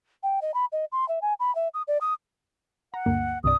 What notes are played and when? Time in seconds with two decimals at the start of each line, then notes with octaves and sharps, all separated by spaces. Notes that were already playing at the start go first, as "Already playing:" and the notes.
0.23 G5
0.42 D#5
0.54 B5
0.72 D#5
0.92 C6
1.09 E5
1.22 G#5
1.40 B5
1.55 E5
1.74 D#6
1.88 D5
2.01 D#6
2.94 F#5 A#5
3.06 D2 G2 A#3
3.44 C2 G2 D5 D#6